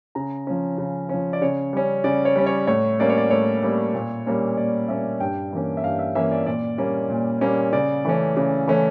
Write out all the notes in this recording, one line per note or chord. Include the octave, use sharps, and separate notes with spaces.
C#3 A#5
F3 C#4
C#3
F3 C#4
D5
C#3 C#5
G3 C#4
C#3 D5
C#5
G3 C#4
C#5
A2 C#5
G3 A#3 C#4 D5
C#5
D5
A2 C#5
G3 A#3 C#4
A#2
G3 A#3 C#4
A#2 D5
G3 A#3 C#4 E5
G2 G5
E3 A#3 C#4
E5
G2 F5
E5
E3 A#3 C#4 E5
D5
A#2 D5
G3 A#3 C#4
A#2
G3 A#3 C#4
C#3 D5
E3 A3 C#4
C#3
E3 A3 C#4